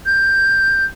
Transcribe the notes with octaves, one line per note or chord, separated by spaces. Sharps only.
G6